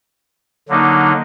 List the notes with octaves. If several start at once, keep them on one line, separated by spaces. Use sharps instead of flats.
D3 F#3 A#3 D#4